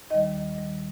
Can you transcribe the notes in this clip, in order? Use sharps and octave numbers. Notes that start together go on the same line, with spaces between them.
D#2 D#3 G3 D#5
D#2 D#3 G3